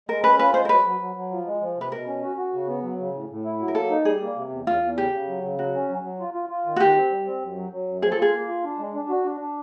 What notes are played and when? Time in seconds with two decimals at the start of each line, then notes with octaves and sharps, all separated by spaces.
0.09 G#3 A#4
0.23 C#4 B4
0.39 F4 B4
0.54 G#3 C5
0.65 A#4
0.69 F#3 B4
0.85 F#3
1.00 F#3
1.16 F#3
1.31 F3
1.46 G#3
1.61 F3
1.76 C3 B4
1.92 B2 A#4
2.07 C#4
2.23 F#4
2.37 F#4
2.53 C#3
2.68 B3
2.83 F#3
2.98 C#3
3.14 A2
3.29 A2
3.44 E4
3.59 F#3
3.68 A#4
3.75 A#3 A4
3.90 D#4
4.05 G3 G#4
4.21 A#3
4.35 C3
4.51 E2
4.67 E2 F4
4.82 E2
4.97 C#3 G4
5.12 C#3
5.28 F#3
5.43 C#3
5.59 F#3 F#4
5.74 C#4
5.89 F#3
6.03 F#3
6.20 F4
6.34 F4
6.49 F4
6.66 D#3
6.76 F#4
6.80 D#3 G4
6.95 C4
7.10 G3
7.26 C4
7.41 F#2
7.56 F#3
7.73 F#3
7.88 F#2
8.02 F3 G#4
8.12 A4
8.17 F4 G#4
8.33 A#3
8.48 F4
8.64 D4
8.79 G#3
8.94 D4
9.09 F#4
9.24 D4
9.41 D4